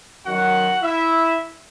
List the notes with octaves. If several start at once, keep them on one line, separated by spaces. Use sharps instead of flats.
F#2 D#3 F#3 F#4 F#5
E4 E5